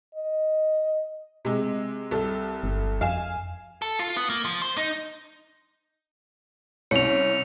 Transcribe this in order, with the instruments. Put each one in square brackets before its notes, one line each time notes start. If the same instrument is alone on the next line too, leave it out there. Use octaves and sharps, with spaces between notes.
[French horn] D#5
[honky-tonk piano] C3 G#3
C2 A4
[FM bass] G1
[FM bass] F2 [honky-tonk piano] F5 G#5 E7
[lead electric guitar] A4
F4
B3
A#3
F3
C5
D#4
[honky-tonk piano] C2 C#4 [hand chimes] C#5 [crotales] C#7 F7